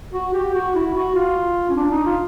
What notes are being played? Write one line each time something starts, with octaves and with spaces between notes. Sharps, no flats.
F#4
G4
F#4
E4
F#4
F4
C#4
D4
D#4
F4